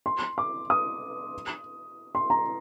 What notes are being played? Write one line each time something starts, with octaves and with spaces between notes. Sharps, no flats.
C6
D6
D#6
C6
A#5